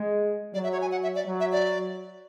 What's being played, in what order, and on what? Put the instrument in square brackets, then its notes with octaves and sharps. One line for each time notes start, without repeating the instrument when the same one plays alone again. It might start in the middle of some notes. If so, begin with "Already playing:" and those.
Already playing: [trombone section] G#3
[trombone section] F#3 [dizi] D5
[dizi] E5
C#5
G#5
F#5
E5
D5
[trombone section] F#3
[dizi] E5
D5